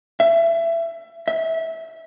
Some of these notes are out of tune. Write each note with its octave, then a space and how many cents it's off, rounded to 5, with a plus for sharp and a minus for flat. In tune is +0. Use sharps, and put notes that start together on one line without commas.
E5 +20
E5 -20